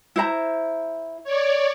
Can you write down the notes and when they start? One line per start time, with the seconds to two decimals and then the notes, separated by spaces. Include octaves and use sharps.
0.16 E4 C5 A#5
1.24 C#5 D5